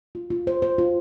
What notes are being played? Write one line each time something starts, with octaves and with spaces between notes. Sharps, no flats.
F4
F4
C5
C5
F4